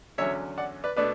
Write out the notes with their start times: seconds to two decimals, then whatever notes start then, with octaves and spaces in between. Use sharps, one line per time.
0.18 E2 D3 F#3 C#4 C#5 E5
0.58 D5 F#5
0.84 B4 D5
0.96 B2 A3 D4 B4 D5